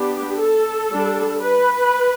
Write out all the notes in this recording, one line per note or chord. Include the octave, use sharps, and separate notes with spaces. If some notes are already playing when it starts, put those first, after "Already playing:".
Already playing: B3 D4 G4
A4
G3 D4
B4